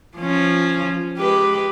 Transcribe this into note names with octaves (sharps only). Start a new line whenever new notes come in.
F3 C#4
G#3 G4 B4